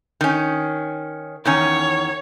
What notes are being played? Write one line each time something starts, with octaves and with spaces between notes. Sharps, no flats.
D#3 C#4
E2 D#3 C#4 C#5